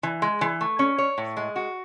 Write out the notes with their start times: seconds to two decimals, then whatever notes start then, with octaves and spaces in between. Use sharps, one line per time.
0.03 E3
0.22 G#3
0.41 E3
0.61 A3
0.79 C#4
0.98 C#5
1.18 A2
1.37 G#3
1.56 F#4